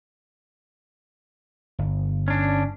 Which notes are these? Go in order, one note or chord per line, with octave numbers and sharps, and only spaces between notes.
G1
C#4 D4